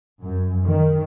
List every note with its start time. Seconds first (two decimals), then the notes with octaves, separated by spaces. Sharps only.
0.22 F#2
0.65 D#3